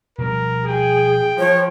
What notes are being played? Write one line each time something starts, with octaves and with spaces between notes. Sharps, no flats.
B2 F3 G3 A#4
G#4 G5
F3 C#5